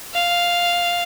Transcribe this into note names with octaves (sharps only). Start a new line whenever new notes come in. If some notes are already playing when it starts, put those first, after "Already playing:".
F5